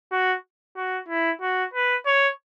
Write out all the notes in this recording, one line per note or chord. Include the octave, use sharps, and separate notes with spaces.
F#4
F#4
E4
F#4
B4
C#5